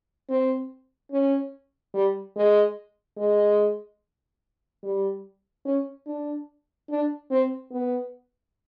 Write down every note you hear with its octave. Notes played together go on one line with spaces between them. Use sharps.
C4
C#4
G3
G#3
G#3
G3
C#4
D4
D4
C4
B3